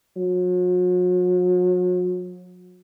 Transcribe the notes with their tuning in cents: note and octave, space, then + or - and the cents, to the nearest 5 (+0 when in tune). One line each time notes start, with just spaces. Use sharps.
F#3 -40